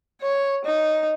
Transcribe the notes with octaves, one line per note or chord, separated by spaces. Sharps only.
C#5
D#4